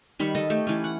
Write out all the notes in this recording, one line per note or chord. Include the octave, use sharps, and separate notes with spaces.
D#3 G3 B5 C#6
A4 D#5 A5
A3 G4 A4
E3 A3 C#4
F#5